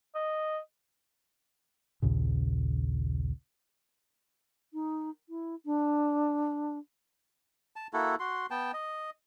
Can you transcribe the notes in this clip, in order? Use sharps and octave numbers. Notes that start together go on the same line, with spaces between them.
D#5
A#1 D#2 A#2 C#3
D#4
E4
D4
A5
A#3 E4 F#4 A4
F#4 C6
B3 G5 A5
D#5